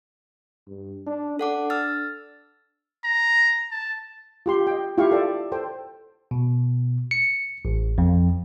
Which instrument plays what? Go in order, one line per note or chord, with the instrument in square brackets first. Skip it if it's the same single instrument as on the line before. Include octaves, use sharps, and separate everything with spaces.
[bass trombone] G2
D4
[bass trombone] D4 [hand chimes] A4 F#5 D6
[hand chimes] E6 F6 A6
[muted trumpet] A#5
A5
[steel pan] F4 G4 C6
D#5 G5
E4 F4 G4 F5 C#6
A4 D5
A4 C5 G5
[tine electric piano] B2
C#7
A1
F2